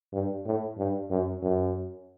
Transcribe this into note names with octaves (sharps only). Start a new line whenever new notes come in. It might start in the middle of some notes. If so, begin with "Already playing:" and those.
G2
A2
G2
F#2
F#2